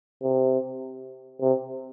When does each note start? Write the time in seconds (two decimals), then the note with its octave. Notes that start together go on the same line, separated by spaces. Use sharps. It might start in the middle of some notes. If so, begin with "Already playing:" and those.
0.23 C3
1.41 C3